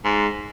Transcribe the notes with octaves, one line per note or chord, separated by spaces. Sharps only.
G#2